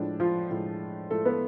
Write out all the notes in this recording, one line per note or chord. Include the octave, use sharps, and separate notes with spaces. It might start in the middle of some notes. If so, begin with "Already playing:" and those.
Already playing: A2 F3 G#3 D4
F3 F4
A2 F3 G#3
A2 F3 G#3 A3 A4
B3 B4